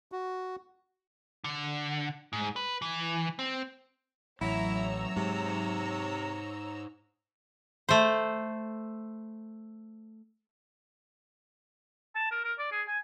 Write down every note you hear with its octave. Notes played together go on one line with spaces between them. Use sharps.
F#4
D3
G#2
B4
E3
C4
A1 F#3 E4 C#5 E5 A#5 E6
G#2 C3
A3 C5
A5
A#4
A#4
D5
G#4
G#5